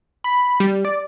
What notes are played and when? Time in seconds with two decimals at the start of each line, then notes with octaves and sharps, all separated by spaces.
0.24 B5
0.60 G3
0.85 D5